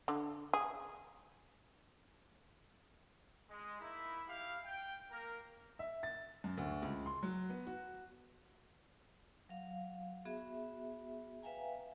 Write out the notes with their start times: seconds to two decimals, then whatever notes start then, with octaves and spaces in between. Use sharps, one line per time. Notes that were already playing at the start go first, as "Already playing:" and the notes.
0.08 D3
0.53 G#4
3.50 G#3
3.81 A#3 D#4 E4
4.28 E4 G4 F5
4.65 G5
5.11 A#3 A#4
5.79 E5
6.03 A6
6.44 F#2
6.57 D2
6.82 C#2
7.06 C6
7.23 F#3
7.50 B3
7.67 F#4
9.49 F#3 F5
10.25 B3 F#4 G#4 E5
11.43 B4 E5 F5 G5 G#5 A#5